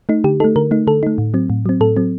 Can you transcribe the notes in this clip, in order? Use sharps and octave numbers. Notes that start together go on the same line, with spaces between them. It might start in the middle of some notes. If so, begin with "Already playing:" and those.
A3 D#4
D3 G4
A3 D#4 A4
D3 A#4
A3 D#4
D3 A4
A3 D#4
A2
F#3 C4
A2
F#3 C4
A2 A4
F#3 C4